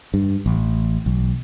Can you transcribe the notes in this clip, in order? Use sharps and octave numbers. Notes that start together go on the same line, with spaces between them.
G2
A1
B1